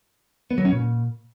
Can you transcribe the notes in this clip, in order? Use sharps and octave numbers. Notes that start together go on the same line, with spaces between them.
B3
F#3
C#4
A#2